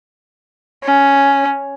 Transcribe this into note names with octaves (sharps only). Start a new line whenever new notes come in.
C#4